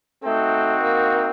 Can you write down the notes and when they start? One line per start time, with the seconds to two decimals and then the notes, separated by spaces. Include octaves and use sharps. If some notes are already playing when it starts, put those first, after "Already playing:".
0.23 A3 C4 D#4 F#4
0.83 A#3